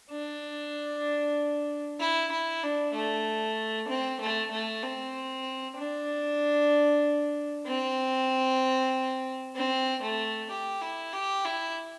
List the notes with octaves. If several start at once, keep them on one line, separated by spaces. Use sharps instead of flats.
D4
E4
E4
D4
A3
C4
A3
A3
C4
D4
C4
C4
A3
G4
E4
G4
E4